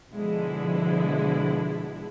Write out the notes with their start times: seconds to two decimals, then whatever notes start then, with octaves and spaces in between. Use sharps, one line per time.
0.11 B2 D3 F3 G#3 E4